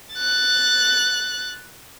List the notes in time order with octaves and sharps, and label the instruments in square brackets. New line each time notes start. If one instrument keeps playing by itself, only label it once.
[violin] F#6 A6